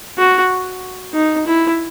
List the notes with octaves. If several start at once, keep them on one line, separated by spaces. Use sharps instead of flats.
F#4
D#4
E4